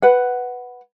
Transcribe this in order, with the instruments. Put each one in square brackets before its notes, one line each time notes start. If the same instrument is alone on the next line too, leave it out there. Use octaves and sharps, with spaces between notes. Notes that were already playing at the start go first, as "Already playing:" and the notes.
[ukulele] B4 F#5